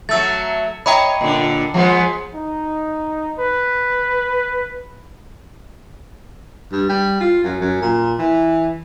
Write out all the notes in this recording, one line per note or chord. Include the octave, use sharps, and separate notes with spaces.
F#3 A3 E6 A6
C#5 D#5 G5 A#5 B5
A#2 D3
F3 G#3 B3
D#4
B4
G2
G3
F4
F#2
F#2
A#2
E3